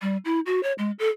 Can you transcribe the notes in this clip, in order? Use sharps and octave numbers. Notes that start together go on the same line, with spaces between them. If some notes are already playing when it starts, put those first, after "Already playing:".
G3
E4
F#4
C#5
G#3
A4